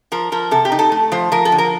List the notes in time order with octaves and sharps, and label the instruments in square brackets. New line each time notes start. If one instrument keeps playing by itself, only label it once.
[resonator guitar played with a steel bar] F3 A#4
F3 A#4
C3 A4
G4
D#4
A4
A3
F3 C5
F3 A#4
A4
D3
A#4